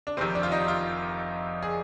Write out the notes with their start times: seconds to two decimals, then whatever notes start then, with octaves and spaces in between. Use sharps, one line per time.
0.07 D4
0.17 F1 F2 C3 D#3 C4
0.35 D4
0.43 F4
0.52 D#4
0.68 F4
1.63 G#4